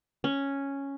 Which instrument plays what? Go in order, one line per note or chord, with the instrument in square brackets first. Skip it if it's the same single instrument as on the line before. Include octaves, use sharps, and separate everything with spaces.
[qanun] C#4